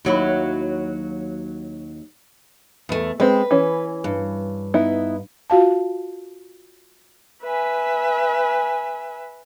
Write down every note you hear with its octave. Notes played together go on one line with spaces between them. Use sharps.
D#2 F#3 E4
E2 A3
G#3 C4 B4
E3 C#4
G2
B3 D#4 E4
F4 F#4 F5 A5
B4 E5 G#5